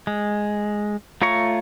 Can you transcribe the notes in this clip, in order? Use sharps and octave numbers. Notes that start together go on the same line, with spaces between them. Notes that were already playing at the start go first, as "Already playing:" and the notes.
G#3
A3 F4 C#5 A#5 C#6